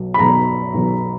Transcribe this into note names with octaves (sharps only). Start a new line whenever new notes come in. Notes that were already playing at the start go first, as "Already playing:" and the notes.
Already playing: B1 B2 F#3
B5
B1 B2 F#3 A#5
B1 B2 F#3